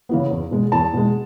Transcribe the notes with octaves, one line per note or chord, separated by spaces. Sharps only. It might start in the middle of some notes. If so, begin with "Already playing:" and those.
C#3 E3 B3
E2
B2 G#3
E2 A5
B2 G#3